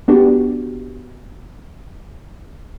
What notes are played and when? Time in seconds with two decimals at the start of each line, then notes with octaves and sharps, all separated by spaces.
0.08 B3 D4 F#4 G4